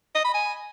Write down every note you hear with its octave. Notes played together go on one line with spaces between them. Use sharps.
D#5
B5
G#5